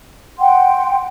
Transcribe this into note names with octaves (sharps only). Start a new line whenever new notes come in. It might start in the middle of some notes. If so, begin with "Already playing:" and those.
F#5 G5 C6